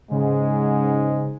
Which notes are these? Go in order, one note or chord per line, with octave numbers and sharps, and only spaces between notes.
G#2 C#3 G#3